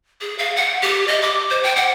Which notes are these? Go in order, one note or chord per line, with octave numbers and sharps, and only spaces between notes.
G#4
F5
F#5
G4
D#5
D6
C5
G5
F#5